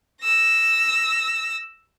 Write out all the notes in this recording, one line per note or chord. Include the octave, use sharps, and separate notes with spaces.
E6 A#6